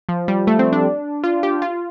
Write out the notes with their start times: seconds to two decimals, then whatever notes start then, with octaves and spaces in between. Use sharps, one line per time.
0.09 F3
0.28 G3
0.47 A3
0.59 C4
0.72 D4
1.24 F4
1.43 G4
1.62 F4